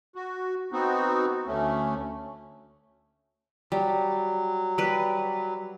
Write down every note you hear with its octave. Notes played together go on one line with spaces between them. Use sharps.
F#4
B3 C4 D#4 F#4
D2 A3 C#4
F#3 G3
G3 B4